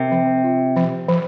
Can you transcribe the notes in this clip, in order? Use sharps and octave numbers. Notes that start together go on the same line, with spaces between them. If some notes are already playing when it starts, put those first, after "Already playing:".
Already playing: C3 A#4
F3
F4
F3
F3